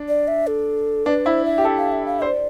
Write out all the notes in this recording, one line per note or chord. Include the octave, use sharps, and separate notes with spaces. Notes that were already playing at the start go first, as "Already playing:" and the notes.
Already playing: D4
D5
E5
A4
D4 B4
E4 C5
E5
G4
A4
F5
E5
F5
C5 D5